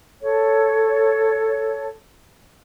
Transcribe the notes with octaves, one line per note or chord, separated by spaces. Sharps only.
A4 C#5